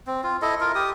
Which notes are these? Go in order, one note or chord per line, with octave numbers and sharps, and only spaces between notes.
C4
F4
E4 A4 D#5
F4 A#4
G4 D#6